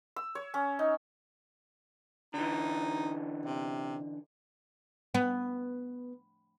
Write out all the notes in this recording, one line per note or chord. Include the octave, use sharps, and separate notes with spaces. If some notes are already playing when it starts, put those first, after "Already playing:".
E6
C#5
C#4
D#4
D3 E3 D#4
C3
B3